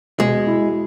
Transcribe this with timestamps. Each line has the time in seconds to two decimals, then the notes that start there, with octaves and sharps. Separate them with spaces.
0.20 B2 G#3
0.47 E4